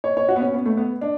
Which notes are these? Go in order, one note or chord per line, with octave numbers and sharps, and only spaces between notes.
C#5
C#5
F#4
B3
C#4
B3
A3
B3
D4